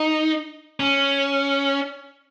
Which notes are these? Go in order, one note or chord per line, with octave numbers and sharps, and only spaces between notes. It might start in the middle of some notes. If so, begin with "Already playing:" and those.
Already playing: D#4
C#4